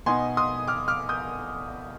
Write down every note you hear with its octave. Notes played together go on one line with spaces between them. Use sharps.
B2 B3 D#4 G#5 C6
C6 D#6
D6 F6
D6 F6
D#6 G6